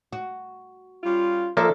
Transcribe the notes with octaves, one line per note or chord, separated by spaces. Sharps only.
F#4
G3 C#4 F4
F3 A#3 A4 D5 E5